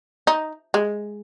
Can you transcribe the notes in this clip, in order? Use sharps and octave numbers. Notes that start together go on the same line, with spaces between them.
D#4
G#3